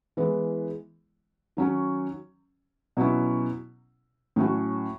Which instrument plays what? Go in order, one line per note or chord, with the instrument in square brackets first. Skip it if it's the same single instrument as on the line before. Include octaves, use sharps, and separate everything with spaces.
[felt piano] E3 G#3 B3 E4
D#3 F#3 C#4
B2 F#3 C#4 E4
A2 F#3 C#4 F#4